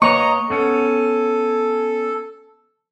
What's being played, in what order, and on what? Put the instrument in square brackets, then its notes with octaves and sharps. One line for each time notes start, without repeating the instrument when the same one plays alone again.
[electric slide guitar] A#3 B4 C#5 [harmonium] D#5 A#5 [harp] C#6
[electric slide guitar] B3 C#4 F#5 [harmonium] A4